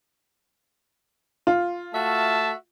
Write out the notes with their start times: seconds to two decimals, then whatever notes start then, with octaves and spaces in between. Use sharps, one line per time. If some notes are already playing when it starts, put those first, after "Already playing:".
1.47 F4
1.94 A3 F#4 E5 A5